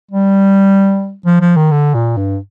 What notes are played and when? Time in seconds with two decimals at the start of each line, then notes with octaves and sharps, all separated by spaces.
0.11 G3
1.26 F3
1.41 F3
1.57 D#3
1.71 D3
1.94 A#2
2.17 G2